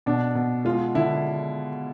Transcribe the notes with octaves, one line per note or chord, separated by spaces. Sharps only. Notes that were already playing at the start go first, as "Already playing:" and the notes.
B2 D4
B2
G#3 F4
D3 E4